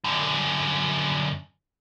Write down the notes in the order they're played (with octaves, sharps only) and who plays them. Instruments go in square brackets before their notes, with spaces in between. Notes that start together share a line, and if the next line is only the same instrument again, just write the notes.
[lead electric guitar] F#2 D3